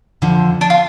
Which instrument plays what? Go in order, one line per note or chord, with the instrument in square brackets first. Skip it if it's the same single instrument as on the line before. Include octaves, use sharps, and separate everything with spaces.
[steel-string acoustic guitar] F2 D3 F3
[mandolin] D4
F4